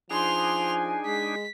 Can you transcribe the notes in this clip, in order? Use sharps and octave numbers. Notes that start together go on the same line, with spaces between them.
F3 D4 D#4 G#4 G#5 C6 F7
G#3 B6